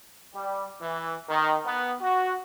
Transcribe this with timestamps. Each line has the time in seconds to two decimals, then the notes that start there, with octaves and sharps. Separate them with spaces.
0.34 G3
0.82 E3
1.29 D#3
1.65 B3
2.02 F#4